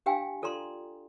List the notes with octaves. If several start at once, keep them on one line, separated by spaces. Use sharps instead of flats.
D4 G4 F5 G5 G#5
F4 A4 D5 A#5 C6